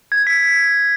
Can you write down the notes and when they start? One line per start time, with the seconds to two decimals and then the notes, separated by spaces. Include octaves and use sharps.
0.12 G#6
0.27 B6